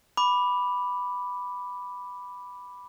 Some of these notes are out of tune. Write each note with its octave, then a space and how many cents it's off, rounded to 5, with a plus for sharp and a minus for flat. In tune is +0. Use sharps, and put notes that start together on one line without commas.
B5 +0 D6 +0